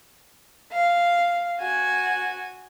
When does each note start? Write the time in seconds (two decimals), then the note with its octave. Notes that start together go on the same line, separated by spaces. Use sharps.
0.72 F5
1.59 F#4 G#5